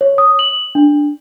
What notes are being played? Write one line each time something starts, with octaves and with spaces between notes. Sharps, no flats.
C#5
D#6
F#7
D4